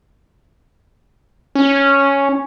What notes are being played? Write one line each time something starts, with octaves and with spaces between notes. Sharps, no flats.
C#4